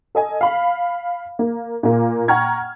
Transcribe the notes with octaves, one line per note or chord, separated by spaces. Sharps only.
A4 D#5 G#5
F5 B5
A#3
A#2 A#3
F#5 G5 A#5 C#6 F6 G#6